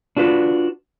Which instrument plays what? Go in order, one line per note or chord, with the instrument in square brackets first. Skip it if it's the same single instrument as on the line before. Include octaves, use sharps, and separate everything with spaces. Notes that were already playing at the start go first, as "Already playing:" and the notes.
[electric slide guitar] D4 F4 F#4 B4